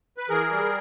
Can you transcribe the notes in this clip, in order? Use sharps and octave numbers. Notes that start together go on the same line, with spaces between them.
B4
E3 G#4 A#4
G3